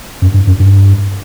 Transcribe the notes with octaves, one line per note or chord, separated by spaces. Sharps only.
F#2
G2
F#2
G2